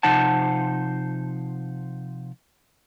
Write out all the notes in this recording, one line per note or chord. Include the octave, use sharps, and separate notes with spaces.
C3 F3 D#4 C5 F#5 A5